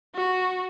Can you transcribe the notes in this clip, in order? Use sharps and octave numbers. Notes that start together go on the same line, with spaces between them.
F#4